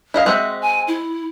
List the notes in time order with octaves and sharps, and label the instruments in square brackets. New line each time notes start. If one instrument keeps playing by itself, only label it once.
[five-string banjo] E4 D#5 F5
[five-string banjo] G#3 C4 F#4 [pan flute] E5
[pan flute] G#5
E4